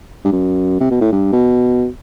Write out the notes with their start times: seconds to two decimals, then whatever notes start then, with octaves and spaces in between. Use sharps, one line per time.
0.25 G2
0.32 F#2
0.80 C3
0.90 B2
1.01 A2
1.12 G2
1.33 B2